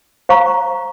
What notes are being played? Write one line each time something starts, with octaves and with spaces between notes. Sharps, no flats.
C5 F5 A#5 C#6